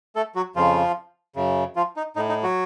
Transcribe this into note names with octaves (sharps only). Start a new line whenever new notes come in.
A3 A4
F#3 F#4
F2 C#3 F3 F4
F#2 C#3
F3 F4
D#4
A2 D#4
D#4
F#3 F#4